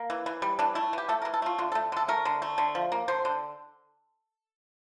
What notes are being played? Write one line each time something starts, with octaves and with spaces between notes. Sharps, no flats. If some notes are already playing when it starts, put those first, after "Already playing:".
Already playing: A#3
E3
E3
G3
E3 D4
A3 E4
E3 G4
A3 A4
A#4
E3
A4
A3 F4
D3 F4
A4
A3
D3 A4
A3 A#4
D3
A3
D3
F3
A#3
D3 C5
D3